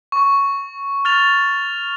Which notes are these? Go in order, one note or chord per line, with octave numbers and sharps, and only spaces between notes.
C#6
F6 A6 F7